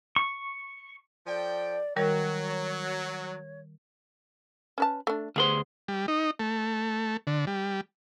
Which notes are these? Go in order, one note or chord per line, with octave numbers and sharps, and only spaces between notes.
C#6
F3 A4 D5 G5
D#3 F#3 G3 A#4 C#5
C#4 B4 A5
A3 D4
D2 G3 B3 G#4 C5 C6
G3
D#4
A3
D3
G3